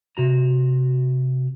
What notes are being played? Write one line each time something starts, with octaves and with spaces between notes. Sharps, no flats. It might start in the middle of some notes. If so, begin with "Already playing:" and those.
C3 F#4 A#5